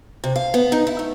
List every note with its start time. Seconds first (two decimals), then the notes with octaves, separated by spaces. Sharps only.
0.24 C3
0.36 F5
0.54 B3
0.72 D#4
0.87 E4
0.99 A3